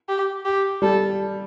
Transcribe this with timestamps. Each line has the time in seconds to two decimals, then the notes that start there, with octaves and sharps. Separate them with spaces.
0.09 G4
0.45 G4
0.82 G3 A4